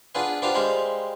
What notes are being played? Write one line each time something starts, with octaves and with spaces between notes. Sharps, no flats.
B3 D4 F4 G#4 B4
B3 D4 F4 G4 C5 F5
G3 G#3 G4 C5 F5